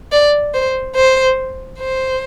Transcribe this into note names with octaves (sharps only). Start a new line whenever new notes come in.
D5
C5
C5
C5